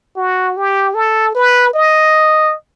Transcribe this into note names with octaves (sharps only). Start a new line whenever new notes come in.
F#4
G4
A4
B4
D#5